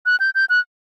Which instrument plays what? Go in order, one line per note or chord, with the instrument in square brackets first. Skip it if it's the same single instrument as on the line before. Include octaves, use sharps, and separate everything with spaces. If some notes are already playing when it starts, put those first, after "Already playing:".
[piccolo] F#6
G6
G6
F#6